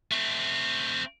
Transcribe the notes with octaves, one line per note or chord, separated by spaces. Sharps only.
A3 C4